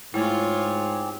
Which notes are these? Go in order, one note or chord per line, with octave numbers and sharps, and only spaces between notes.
G#2 A3 C4 E4 F4 G4 G#4 C#5